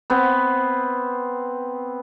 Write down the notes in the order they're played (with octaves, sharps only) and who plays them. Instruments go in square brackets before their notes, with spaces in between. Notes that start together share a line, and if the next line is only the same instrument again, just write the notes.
[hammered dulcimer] B3 C4